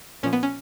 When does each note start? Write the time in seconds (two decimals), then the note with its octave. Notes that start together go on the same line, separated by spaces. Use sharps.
0.23 A#2 F3 C#4
0.33 B3
0.43 C#4